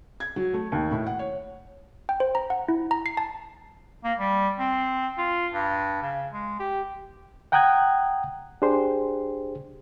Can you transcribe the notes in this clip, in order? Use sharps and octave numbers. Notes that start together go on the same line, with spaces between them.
G#6
F#3
A3
D#2
A2
F#5
C#5
G5
C5
A#5
F#5
E4
A#5
C7
A5
A#3
G3
C4
F4
G2
C#3
G#3
G4
F#5 G5 A#5 D#6 F#6 G#6
D4 G4 G#4 C5 C6